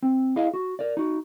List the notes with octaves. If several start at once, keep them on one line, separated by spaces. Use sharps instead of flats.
C4
E4 G#4 D#5 F5
F#4
A#4 D5
D#4 F#4